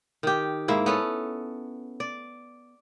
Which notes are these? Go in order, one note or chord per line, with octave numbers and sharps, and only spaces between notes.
D#3 G4
G#2 A#3 E4
B3 C#4 A4
D5